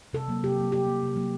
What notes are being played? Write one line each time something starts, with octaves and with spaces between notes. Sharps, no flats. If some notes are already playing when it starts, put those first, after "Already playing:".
C3 A4
F#3 A#3
C3 G4
F#3 A#3
C3 G4
F#3 A#3
C3
F#3 A#3